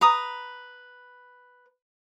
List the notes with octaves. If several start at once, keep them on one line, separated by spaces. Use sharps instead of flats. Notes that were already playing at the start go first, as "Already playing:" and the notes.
B4 A#5 D#6